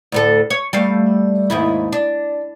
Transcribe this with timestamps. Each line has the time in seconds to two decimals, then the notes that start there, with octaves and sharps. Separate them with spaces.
0.12 D2 A2 A4
0.50 C#5
0.73 G3 A3 F5
1.50 D#2 G#2 E4
1.92 D4